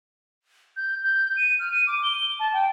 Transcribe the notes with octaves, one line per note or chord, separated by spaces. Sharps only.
G6
G6
D#7
F6
D#7
D6
G7
A5
G5